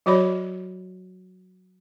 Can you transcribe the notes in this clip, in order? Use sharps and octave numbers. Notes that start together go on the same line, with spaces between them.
F#3 F#4 C#5 D5 B5